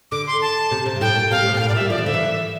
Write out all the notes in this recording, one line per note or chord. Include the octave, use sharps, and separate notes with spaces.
D3 D6
C6
A5
C3
C3
G2
A2 G5
A#2
C3 F5
A2
A#2 G5
A2 F5
A#2 D5
G3 E5
F3 D5
E3
D3 E5
E3